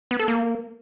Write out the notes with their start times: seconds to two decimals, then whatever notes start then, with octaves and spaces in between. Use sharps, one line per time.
0.11 B3
0.19 A4
0.28 A#3